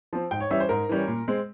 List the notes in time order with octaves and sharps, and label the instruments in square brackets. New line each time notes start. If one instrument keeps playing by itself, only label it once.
[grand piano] F3 C4
G#2 G5
C#5
E3 G3 C#4 E5
C5
G#2 A#4
E3 G3 C#4
A#2
G#3 C4